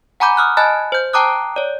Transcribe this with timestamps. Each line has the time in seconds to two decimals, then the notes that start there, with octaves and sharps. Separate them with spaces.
0.20 F#5 G#5 A#5 B5 D6 G6
0.37 D#6 F6 F#6
0.57 D#5 G#5 A5 B5 F#6 A6
0.92 C5 G6
1.13 G5 A5 A#5 D6 D#6 F#6
1.56 C#5 D5